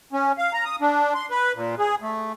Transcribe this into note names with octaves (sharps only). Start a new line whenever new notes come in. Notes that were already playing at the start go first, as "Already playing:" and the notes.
C#4
F5
A#5
D#6
D4
C6
B4
A#2
G#4
A3